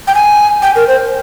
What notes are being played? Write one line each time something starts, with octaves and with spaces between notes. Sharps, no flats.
G5
G#5
G5
A#4
C5